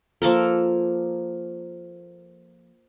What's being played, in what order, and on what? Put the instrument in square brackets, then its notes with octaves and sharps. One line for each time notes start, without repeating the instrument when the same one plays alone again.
[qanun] F3 A#3 A4 A#4